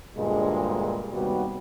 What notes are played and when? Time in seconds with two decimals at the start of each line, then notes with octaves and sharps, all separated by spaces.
0.17 D2 G2 A#2 G#3
1.13 D#2 C3 G3 B3 F#4